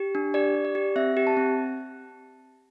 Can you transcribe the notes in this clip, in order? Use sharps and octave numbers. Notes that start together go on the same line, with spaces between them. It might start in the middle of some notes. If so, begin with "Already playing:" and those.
Already playing: G4
D4
G4 D5
G4
D5
G4
C4 E5
G4
A5
C4